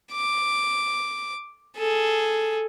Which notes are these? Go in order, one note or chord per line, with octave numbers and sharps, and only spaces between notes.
D6
G#4 A4